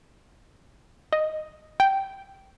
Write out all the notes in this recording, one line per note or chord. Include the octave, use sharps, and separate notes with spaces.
D#5
G5